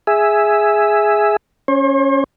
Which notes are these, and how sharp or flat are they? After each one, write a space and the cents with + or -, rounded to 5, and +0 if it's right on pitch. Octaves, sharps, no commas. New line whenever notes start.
G#4 +0 E5 +0
C#4 +0 C5 +45